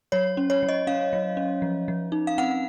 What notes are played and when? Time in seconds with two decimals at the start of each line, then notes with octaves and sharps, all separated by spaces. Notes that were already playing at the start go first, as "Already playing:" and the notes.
0.12 F#3 C#5
0.37 C#4
0.50 C#5
0.63 F#3
0.69 D#5
0.87 C#4 F5
1.13 F#3
1.37 C#4
1.62 F3
1.88 F3
2.12 D#4
2.27 F5
2.38 C4 F#5